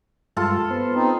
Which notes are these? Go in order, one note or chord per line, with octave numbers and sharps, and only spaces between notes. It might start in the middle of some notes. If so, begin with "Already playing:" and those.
G2 G#3 F4 A4 A5
B3 C5
C4 D#4